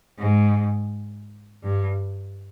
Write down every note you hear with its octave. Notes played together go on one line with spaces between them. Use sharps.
G#2
G2